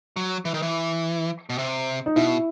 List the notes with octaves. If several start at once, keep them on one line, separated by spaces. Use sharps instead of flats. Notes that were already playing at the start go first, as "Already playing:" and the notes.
F#3
E3
D#3
E3
B2
C3
D#4
B2 E4